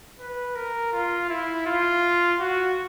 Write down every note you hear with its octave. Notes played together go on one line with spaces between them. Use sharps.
B4
A#4
F4
E4
F4
F#4